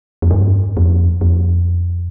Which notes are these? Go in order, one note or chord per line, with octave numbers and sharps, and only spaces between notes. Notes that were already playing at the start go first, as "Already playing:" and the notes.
F2
G2
F2
F2